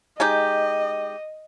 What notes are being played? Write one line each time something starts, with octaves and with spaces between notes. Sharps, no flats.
G#3 D#4 G4 D#5